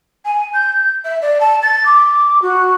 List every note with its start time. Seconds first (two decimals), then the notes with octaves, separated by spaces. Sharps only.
0.25 G#5
0.54 G6
1.04 E5
1.21 D5
1.40 A5
1.62 A6
1.85 D6
2.42 F#4